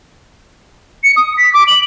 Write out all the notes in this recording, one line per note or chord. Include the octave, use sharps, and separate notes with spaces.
C#7
D#6
B6
D6
F#7